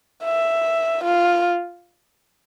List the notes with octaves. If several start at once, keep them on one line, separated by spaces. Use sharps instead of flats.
E5
F4